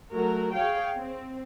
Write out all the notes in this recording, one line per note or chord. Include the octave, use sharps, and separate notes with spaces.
F#3 A3 F#4 A#4
G#4 C#5 F5 G5
C4